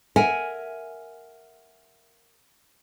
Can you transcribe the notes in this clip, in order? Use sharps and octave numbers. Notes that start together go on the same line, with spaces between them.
A#4 E5 F#5 G#5